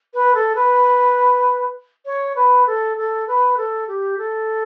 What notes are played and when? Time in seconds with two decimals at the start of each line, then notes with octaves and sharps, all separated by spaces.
0.14 B4
0.34 A4
0.55 B4
2.05 C#5
2.35 B4
2.67 A4
2.97 A4
3.27 B4
3.57 A4
3.88 G4
4.18 A4